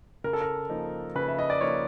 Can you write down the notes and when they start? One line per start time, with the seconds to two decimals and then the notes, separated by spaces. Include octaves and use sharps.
0.24 C#3 A#4
0.33 A4
0.42 A#4
0.69 F3 A#3 D#4
1.15 C#3 B4
1.28 E5
1.39 D#5
1.50 D5
1.61 F3 A#3 D#4 C#5